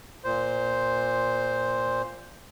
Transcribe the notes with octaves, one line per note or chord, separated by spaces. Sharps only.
A#2 C5